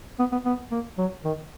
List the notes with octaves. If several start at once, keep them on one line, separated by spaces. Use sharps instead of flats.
B3
B3
B3
A#3
F#3
D#3